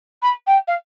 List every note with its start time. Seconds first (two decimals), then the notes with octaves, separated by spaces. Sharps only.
0.22 B5
0.47 G5
0.67 F5